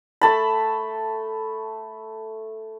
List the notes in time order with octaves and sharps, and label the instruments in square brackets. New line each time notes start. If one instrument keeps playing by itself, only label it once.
[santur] A3 A5 B5